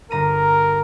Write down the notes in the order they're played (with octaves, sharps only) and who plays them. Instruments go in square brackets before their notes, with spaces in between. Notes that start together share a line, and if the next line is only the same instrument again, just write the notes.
[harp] G1 A#5 D#7 [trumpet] A#4